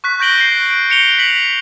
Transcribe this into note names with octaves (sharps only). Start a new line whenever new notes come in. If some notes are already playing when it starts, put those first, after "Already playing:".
C#6 F#6 B6
F#6 G6 A#6 D7 F#7 G7
C7
D7
C#7 F7 G7
B6 F#7